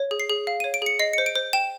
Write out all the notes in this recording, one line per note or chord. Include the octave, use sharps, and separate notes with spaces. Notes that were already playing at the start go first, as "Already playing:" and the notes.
Already playing: C#5
G#4
C7
G#4
F5
C#5 D#7
D7
G#4 C#7
D#5 C7
C5 C#7
D7
C5
G5 E7